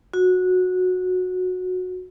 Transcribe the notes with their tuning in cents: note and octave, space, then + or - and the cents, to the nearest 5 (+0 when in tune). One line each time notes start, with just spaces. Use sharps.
F#4 -15